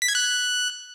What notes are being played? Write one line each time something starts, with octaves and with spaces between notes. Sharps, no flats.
B6
G#6
F#6